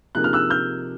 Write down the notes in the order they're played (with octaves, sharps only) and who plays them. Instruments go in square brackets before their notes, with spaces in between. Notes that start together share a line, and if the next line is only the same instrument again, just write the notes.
[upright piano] C3 F3 A#3 D#4 G#4 [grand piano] F#6
[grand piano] F6
E6 F#6
F6 G6